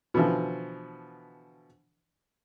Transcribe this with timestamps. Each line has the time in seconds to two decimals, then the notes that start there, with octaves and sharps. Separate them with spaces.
0.14 B2 D3 E3 F3